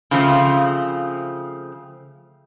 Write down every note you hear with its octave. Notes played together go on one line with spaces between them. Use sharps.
C#3 F3 A3 C4